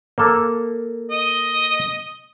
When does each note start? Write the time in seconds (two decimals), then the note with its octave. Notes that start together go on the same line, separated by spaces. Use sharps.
0.18 A#3 A4
1.11 D#5